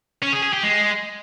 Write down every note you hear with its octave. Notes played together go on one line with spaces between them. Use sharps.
C#4
G#4
G#4
G4
G#3